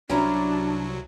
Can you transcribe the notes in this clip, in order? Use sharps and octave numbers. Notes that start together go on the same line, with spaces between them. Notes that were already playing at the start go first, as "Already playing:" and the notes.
C2 F#3 C#4 D4 E4 A#5